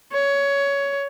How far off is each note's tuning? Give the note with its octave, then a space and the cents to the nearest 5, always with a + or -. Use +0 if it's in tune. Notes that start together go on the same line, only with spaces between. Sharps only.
C#5 +15